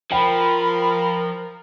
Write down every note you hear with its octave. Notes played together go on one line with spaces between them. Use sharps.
F3 A#4 G5 B5